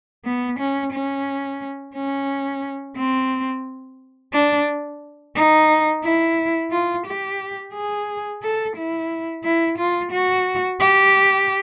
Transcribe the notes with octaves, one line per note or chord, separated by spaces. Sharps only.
B3
C#4
C#4
C#4
C4
D4
D#4
E4
F4
G4
G#4
A4
E4
E4
F4
F#4
G4